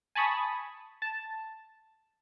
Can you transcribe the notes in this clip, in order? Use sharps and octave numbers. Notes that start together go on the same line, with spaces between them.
G#5 A5 B5 C#6 D#6
A5